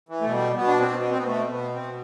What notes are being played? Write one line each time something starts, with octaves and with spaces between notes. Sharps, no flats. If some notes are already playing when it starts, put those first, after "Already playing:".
E3
B2 A3
G3
B2 B3
D4
C4
B2
B3
C4
B2 B3
A3
B2 B3
C4
B2